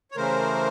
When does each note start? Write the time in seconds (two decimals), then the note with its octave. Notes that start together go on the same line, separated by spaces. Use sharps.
0.11 C#5
0.16 C#3 E3 A3 A#4 C5